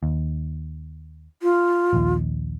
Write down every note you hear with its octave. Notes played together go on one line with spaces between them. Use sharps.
D#2
F4
A#1 D#2